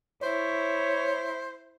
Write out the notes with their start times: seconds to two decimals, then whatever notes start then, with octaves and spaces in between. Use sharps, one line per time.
0.23 E4 C5 C#5